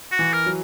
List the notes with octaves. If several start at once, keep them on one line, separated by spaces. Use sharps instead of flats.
F#4
E3
A#4
F#3